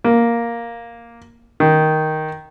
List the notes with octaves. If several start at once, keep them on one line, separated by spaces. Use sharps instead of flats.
A#3
D#3